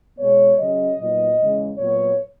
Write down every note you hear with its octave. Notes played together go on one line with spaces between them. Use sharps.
B2 G#3 B3 C#5
C#3 F#3 C#4 D#5
A#2 F#3 B3 D#4
E2 C#3 G#3
A#2 F#3 B3 C#5